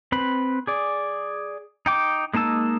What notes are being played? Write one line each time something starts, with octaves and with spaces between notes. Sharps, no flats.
C4 B4 B5
G#4 D5
D#4 G5 D6
G#3 A#3 D#4 A5 E6